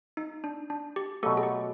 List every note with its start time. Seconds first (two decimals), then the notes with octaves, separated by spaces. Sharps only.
0.17 D#4
0.44 D4
0.70 D4
0.96 G4
1.23 B2 F#3 A3 G4 A4
1.37 G#4
1.43 G4